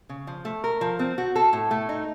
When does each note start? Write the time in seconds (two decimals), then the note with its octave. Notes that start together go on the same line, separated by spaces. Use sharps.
0.09 C#3
0.27 F3
0.45 A3
0.64 A#4
0.81 F3
0.99 C4
1.18 F#4
1.36 A4
1.53 A2
1.71 A3
1.89 D#4